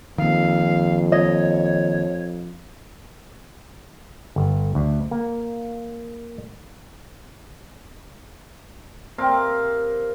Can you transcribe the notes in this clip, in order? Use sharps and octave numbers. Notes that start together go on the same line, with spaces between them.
F2 D#3 A#3 F5
C#5 D#5
G1
D2
A#3
C3 C4 A#4 F5